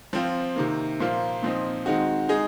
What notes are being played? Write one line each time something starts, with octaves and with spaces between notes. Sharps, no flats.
F3 C4 F4
C3 D#3 A#3
A#2 F3 A#3 F4 C5
A#2 F3 C4 D#4
D#3 G#3 C4 D#4 F#4
G#3 D#4 G#4